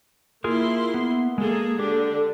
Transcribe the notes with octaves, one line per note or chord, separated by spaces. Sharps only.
A#3 E4 F4 G#4 A#4 C6
B3
G#3 A#3 G#4 A4
D3 D4 G4